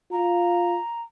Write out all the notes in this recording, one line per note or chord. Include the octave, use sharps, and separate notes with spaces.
F4 A#5